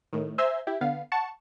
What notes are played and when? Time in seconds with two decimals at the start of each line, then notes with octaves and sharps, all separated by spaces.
0.13 A2 D#3
0.38 C5 E5 G#5 A#5 C6 E6
0.67 E4 G4
0.81 D3 B3 F5
1.12 F#5 A5 C#6